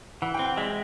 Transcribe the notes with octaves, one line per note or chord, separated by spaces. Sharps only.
E3 F#5
G5
C4
F#5
G#3 E5